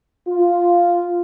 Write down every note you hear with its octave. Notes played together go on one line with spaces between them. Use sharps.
F4